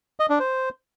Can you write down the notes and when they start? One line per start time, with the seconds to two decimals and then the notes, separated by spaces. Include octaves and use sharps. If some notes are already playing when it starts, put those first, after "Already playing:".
0.20 D#5
0.30 D4
0.40 C5